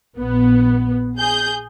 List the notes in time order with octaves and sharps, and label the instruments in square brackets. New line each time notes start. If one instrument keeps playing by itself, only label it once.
[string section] A#1 B3
G#4 G6